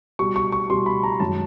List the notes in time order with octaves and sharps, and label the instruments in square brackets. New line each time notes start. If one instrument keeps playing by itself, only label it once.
[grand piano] B2 G3 C#6
C#6
C#6
B2 G3 C6
B5
A#5
F#2 D#3 G#3 A5